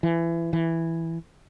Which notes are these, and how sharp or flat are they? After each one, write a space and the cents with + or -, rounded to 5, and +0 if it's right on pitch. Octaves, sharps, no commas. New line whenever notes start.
E3 +25
E3 +0